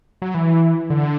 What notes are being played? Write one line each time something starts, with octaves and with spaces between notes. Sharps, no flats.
F#3
E3
D3